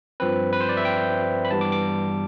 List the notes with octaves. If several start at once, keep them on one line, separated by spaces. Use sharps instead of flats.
G2 F3 C4 B4
B4
C5
D5
E5
G5
B5
G2 E3 G3 B3 A5
D6
D6